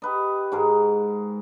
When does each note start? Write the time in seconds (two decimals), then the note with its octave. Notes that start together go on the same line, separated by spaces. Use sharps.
0.02 G4 B4 D#5
0.52 G#2 G#3 A#4